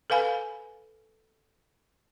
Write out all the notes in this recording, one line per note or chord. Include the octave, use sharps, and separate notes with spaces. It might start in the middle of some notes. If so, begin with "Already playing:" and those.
A4 B4 F5 G#5 B5